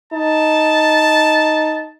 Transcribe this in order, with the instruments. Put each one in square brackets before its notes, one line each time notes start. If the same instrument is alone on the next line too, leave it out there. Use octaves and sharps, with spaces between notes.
[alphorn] D#4 [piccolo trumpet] A5